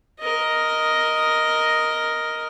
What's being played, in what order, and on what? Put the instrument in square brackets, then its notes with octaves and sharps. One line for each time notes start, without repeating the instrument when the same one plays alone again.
[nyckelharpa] A#4 D#5